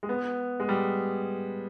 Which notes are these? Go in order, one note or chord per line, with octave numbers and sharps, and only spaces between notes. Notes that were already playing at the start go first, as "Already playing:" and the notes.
G#3
B3
G#3
G3